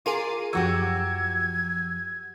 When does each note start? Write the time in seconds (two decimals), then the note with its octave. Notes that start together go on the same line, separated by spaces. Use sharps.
0.06 F4 G#4 A#4 D6 D#7
0.53 F#2 F3 F#3 F#4 G4 E6 G#6